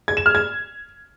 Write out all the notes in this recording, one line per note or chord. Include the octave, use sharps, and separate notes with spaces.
G#6
E7
F6
G#6